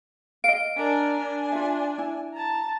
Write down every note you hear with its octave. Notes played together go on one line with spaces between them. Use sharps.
D#5 F5 D7
D4 A#4 G#5
D4
F4 E5
E4
A5 A#5